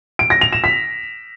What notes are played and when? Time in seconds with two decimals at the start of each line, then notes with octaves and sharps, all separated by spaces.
0.19 D7
0.30 A#6
0.41 F7
0.53 E7
0.64 B6